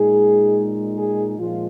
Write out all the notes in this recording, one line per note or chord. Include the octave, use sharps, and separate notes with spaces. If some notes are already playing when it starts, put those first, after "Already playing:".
Already playing: A#2 G#3 D#4 G#4
G#4
A#2 F3 G#3 F4